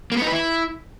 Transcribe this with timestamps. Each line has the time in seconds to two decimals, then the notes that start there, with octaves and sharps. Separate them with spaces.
0.12 A#3
0.17 B3
0.22 D#4
0.27 B4
0.32 E4